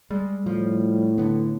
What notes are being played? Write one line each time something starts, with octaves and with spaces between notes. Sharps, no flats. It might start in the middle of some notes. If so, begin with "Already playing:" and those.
G3 G#3
A2 F3
D3 B3